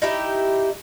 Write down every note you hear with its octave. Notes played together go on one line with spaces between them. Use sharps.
D#4 E4 G4